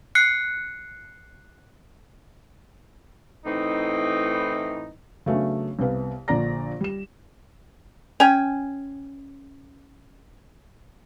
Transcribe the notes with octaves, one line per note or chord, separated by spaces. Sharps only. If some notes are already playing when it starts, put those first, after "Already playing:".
F#6 C7 C#7
A2 E3 C4 D#4
C#3 F#3 A3 B3 C#4 D4
C2 C3 B3 F5
A#1 A#2 D3 D5 A#5 A#6
G3 E7
C#4 G5 G#5